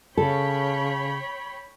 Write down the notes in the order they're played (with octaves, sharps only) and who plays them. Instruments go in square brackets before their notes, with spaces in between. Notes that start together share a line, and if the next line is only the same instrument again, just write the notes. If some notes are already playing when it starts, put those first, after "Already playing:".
[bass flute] C#3 [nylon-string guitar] A4 [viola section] C#5 G5 B5